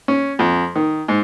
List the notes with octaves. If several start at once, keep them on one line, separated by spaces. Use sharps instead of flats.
C#4
F2
D#3
G#2